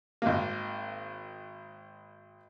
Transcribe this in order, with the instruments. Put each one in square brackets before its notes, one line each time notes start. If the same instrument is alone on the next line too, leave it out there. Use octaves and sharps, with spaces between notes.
[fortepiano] G#1 A#3